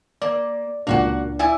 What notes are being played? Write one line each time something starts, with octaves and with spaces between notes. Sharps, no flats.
A#3 D5
C#2 A#2 A#3 D4 F#4 F#5
E4 D5 G#5